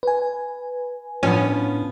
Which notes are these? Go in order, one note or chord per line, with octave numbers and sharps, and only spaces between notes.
B4 G#5
A2 F3 B3 C#4 D4